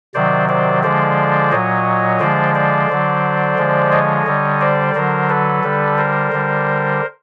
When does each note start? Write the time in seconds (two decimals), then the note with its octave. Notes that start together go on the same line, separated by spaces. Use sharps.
0.14 C3 D#3 F#3 C5 D5
0.49 C5 D5
0.83 D3 F3 G#3 C5 D5
1.51 A#2 F#3 C#5 D#5
2.20 D3 F3 G#3 C5 D5
2.55 C5 D5
2.90 D3 F#3
3.58 D3 F3 G#3
3.92 C#5 D#5
4.26 D3 G3
4.61 C5 D5
4.95 D3 F#3 A#4 C5
5.29 A4 B4
5.64 D3 G3
5.98 A#4 C5
6.32 D3 G3